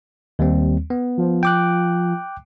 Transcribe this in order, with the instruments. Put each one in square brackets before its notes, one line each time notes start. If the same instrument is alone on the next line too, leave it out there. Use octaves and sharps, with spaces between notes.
[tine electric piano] D#2 G3 C4
B3
[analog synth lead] F3
[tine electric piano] G5 D6 F#6